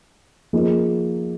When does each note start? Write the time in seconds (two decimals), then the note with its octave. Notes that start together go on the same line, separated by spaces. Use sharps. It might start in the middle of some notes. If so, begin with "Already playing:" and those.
0.53 F3 A#3 D#4 G#4